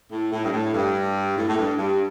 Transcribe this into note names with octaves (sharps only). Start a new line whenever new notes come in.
A2
A2
G2
A2
G2
A2
A2
G2
G2